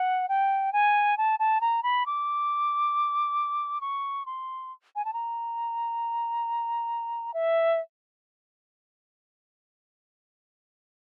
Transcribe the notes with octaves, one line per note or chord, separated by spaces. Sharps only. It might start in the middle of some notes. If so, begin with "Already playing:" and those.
Already playing: F#5
G5
G#5
A5
A5
A#5
B5
D6
C#6
C6
G#5
A5
A#5
E5